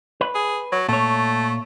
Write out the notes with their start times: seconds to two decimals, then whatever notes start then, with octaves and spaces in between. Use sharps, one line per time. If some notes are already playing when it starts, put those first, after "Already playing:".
0.21 B4
0.35 G#4
0.72 F#3
0.89 A#2 A3 C#5